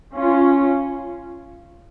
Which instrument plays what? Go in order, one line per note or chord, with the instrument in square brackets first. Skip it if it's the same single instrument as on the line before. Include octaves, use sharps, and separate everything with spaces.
[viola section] C#4 F4